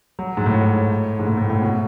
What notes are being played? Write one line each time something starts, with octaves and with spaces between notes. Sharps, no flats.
F#3
G#2
A2
G#2
A2
A2
A2
B2